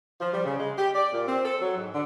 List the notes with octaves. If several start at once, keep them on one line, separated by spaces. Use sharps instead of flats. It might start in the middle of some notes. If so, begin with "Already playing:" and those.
F3
G3
C#3
G#3
G4
D5
A#2
C4
A4
F#3
G#2
D3